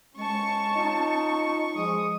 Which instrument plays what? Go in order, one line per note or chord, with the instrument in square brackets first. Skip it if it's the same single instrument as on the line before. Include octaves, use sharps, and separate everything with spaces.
[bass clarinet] G#3 [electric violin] C#4 A5 [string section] C#6
[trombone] D#4 [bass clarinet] F4
[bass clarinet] F3 [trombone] G#3 [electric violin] D#6